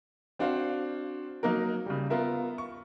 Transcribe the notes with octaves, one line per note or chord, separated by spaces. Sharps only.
C4 D4 F#4 C5 F5
F#3 A#3 D#4 A#4
C#3 G3
B3 F4 A#4 E5
C#6